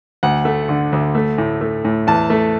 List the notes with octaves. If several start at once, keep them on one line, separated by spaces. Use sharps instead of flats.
D2 F#5
A3
D3
D2
A3
A2
A3
A2
E2 A5
A3